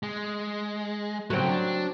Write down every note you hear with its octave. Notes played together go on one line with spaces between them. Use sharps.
G#3
C#3 F#3 A3 C4
D4